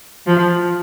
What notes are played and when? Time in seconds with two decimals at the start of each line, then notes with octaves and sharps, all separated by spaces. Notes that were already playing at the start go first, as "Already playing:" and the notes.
0.27 F3